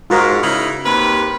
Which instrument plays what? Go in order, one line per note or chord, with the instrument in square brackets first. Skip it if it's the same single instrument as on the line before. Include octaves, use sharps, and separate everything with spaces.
[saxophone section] G#2 [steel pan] F4 F#4 A#4
[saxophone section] C#3 D#4 E4
D#2 C3 B4